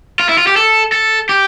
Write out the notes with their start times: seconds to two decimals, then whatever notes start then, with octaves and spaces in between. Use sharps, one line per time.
0.20 F4
0.29 E4
0.38 F4
0.47 G4
0.57 A4
0.92 A4
1.29 G4